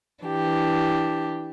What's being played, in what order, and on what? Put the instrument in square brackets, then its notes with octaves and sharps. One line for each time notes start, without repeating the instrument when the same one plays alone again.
[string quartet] E3 D4 G4